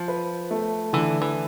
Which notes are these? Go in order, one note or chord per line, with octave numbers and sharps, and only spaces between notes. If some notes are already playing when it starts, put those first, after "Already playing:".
Already playing: F3
B4
A3
D3 E3
E3